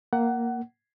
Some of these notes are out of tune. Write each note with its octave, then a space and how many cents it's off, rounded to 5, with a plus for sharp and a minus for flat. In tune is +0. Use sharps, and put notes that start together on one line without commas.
A#3 +0 F#5 +20